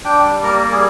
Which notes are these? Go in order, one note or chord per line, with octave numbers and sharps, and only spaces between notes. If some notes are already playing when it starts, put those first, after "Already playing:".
D4 G5
G3
A#3 A#4
G3
G#4